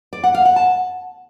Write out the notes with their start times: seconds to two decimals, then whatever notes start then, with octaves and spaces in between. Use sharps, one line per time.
0.13 D5
0.24 F#5
0.34 F5
0.45 F#5
0.56 A5